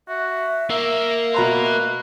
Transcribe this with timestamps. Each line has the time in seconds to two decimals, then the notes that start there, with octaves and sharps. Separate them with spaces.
0.08 F#4 E5
0.70 A#3 E6
1.34 B2 B4 A#5 C6